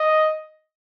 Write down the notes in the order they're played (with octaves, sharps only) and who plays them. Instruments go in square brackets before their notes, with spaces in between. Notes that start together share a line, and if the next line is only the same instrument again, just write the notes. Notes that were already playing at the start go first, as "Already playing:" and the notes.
Already playing: [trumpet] D#5